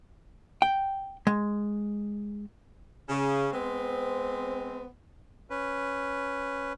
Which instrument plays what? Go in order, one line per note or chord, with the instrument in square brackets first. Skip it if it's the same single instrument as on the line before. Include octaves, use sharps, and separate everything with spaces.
[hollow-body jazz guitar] G5
G#3
[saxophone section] C#3
G#3 B3 C4
[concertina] C#4 B4